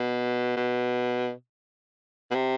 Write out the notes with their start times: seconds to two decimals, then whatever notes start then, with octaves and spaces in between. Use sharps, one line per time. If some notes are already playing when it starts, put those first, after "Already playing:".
Already playing: B2
0.56 B2
2.31 B2
2.35 C3